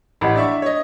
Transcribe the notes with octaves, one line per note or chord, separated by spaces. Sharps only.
A1 G4 D#5 F#5 B5
D4 D5 E5 C#6
C#5 D#5